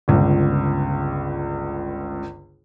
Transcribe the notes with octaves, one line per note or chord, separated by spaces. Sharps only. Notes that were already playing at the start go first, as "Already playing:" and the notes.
G1 C#2